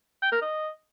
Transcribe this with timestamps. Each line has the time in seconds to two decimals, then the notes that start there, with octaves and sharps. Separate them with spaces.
0.22 G5
0.32 A#4
0.42 D#5